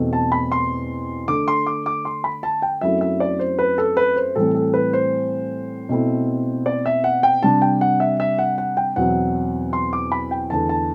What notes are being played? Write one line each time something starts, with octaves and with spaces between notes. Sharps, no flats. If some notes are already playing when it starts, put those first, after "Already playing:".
Already playing: E2 B2 A3 C4
A5
B5
C6
D3 A3 D4 D6
C6
D6
D6
C6
B5
A5
G5
F#2 F#3 A3 C4 E4 E5
E5
D5
C5
B4
A4
B4
C5
A2 E3 G3 C4 A4
A4
B4
C5
B2 A3 C4 E4
D5
E5
F#5
G5
C3 G3 D4 A5
G5
F#5
E5
E5
F#5
F#5
G5
E2 B2 F#3 C4 E4 F#5
C6
D6
B5
G5
E2 D3 A3 A5
A5